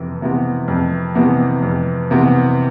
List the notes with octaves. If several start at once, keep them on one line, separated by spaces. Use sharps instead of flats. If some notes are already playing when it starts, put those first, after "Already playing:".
Already playing: F2 C3 E3
C3 E3 B3
F2
C3 E3 B3
F2
C3 E3 B3